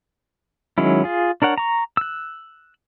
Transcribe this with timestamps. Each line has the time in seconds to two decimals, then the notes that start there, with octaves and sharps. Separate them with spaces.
0.78 D#3 F#3 G#3 C#4 E4
1.04 F4 G#4
1.42 D4 A#4 C#5 F#5
1.58 A#5 C#6
1.97 E6 F#6